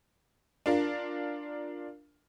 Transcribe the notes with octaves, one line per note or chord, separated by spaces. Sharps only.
D4 F4 A#4